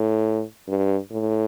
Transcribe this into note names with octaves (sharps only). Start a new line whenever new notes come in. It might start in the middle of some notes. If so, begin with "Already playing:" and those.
Already playing: A2
G2
A2